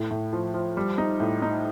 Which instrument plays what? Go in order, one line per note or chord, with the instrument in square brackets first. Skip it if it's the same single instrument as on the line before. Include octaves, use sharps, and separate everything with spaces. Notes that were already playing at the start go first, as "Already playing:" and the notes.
Already playing: [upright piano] A2
A2
F3
F3
G3
D#4
A2
D#4